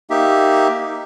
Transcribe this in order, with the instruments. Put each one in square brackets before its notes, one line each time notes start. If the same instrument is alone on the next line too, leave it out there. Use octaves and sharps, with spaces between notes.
[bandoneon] A#3 D#4 G4 E5